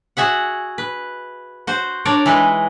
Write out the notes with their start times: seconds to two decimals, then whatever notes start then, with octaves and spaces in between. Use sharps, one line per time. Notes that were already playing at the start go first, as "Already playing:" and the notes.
0.17 F#4 G#4 E5 F#5
0.78 B4
1.67 F#4 C5
2.05 D4 A#4 C#5 D5
2.26 E3 G#3 D#4 B4 D#5